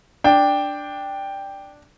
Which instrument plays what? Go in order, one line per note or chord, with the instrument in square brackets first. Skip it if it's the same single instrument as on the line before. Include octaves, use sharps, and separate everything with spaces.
[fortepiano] D4 [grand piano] G5